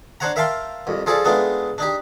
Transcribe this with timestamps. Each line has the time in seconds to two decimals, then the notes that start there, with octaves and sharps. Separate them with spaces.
0.20 D4 C5 C#5 F#5 A#5
0.36 A#4 E5 F5 G5 A5 C6
0.87 C2 F2
1.06 F3 F4 G#4 A4 D5
1.25 G#3 A3 B3 D4 D#4 F4
1.78 D4 D#4 G4